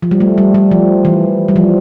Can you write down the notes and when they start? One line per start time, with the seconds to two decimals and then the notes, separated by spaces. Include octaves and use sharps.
0.02 F3
0.11 G3
0.20 A3
0.38 G3
0.54 G3
0.71 F3
1.05 E3
1.48 G3
1.56 F3